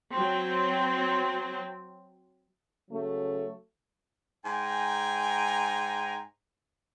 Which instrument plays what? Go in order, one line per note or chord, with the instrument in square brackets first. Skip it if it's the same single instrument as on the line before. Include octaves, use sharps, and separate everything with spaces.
[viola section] F#3 C4
[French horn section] C#3 F#3 A3
[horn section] G#2 G5 G#5 A#5